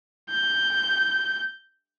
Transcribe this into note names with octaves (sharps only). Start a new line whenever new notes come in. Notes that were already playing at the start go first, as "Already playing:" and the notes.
G6